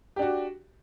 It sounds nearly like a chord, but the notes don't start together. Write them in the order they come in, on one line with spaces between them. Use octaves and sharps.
G4 D4 F#4